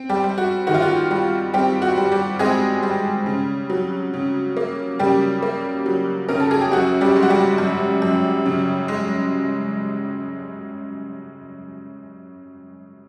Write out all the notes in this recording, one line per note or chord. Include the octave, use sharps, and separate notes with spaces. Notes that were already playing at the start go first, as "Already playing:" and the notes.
Already playing: C4
G3 G4
G3
F#4
D#3 F#4
F4
F#4
G3
G3 C4 G4
F#4
G3
G3 G4
G#3 C4 G#4
G3
C#3
F#3
C#3
A#3
C#3 G3 G4
A#3
F#3
C#3 A#4
A4
G#4
G4
F#2 F#4
G3 G4
G#3
F#4
G3 G4
F#2
F#2
C#3
G#3